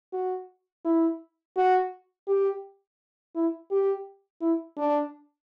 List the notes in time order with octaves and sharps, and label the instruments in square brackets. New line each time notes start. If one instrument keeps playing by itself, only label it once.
[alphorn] F#4
E4
F#4
G4
E4
G4
E4
D4